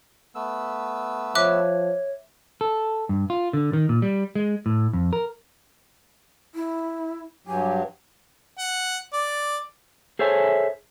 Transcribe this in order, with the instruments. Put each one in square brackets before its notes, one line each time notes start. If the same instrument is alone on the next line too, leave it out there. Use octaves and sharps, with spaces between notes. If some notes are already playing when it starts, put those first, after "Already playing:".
[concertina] A3 B3 E6
[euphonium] F3 [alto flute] C#5 [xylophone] E5 D6 F#6
[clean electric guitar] A4
G2
F4
D3
D#3
A#2
G3
G#3
A2
F2
A#4
[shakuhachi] E4
[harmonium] G2 F#3 G4 [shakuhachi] G#5
[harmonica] F#5
D5
[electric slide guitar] G#4 A4 C5 C#5 E5 G#5